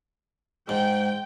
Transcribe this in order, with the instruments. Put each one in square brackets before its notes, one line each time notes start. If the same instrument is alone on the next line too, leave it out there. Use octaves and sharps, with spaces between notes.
[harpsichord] G#2 [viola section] G5